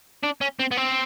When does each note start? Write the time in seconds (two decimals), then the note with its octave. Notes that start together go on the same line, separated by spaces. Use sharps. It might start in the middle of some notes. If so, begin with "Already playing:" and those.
0.23 D4
0.41 C#4
0.59 C4
0.71 B3
0.77 C4